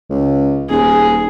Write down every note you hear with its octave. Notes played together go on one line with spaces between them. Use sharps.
C#2
D#1 G#4